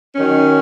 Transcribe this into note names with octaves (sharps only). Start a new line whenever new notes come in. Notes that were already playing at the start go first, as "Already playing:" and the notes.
D#3 F#3 C#4